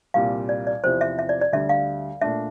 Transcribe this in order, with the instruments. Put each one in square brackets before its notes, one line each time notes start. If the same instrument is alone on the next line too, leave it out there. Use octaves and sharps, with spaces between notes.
[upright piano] C2 A#2 G3 [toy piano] F5
[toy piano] D5
D5
[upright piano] E2 C3 F3 C4 G4 [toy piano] C5
[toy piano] E5
E5
D5
D5
[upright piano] D2 D3 G3 [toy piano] E5
[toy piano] F5
[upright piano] A#2 A3 D4 [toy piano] E5